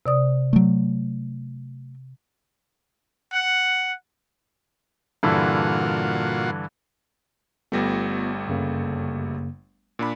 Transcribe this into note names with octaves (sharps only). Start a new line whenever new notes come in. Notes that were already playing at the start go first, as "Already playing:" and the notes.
C3 D5 D#6
F#3 A3
F#5
G2 A#2 D3 E3 F4 F#4
G1 G3 A3 B3 F4 A#6
F#2 C#3 A#3
A#2 D4 B5